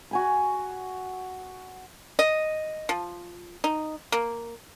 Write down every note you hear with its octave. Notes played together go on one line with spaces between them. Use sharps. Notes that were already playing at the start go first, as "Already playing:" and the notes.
F#4 G#5 B5
D#5
F3
D#4
A#3